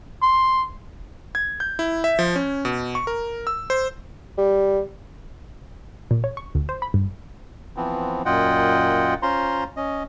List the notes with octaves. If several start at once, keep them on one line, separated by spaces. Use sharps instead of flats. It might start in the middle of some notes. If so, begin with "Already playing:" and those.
C6
G#6
G6
E4
E5
F3
C#4
B2
C#6
A#4
E6
C5
G3
A#2
C#5
C#6
D2
C5
B5
G2
E3 F3 B3 C4
F#2 A#2 F4 D#5 F#5 G5
C#4 F4 C5 A#5 C6
C#4 D#5